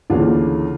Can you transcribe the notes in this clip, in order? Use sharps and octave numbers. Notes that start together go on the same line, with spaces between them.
D2 C#3 E3 A#3 D4 F4